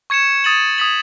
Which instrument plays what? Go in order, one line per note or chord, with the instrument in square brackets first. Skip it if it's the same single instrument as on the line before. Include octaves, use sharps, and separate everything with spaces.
[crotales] C#6 G#6 C#7 E7
D#6 A6 D#7 F#7
D#6 G#6 B6 F#7